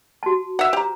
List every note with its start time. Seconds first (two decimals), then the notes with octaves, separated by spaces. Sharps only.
0.23 F#4 A5
0.59 E5 F#5
0.73 G4 C5 A#5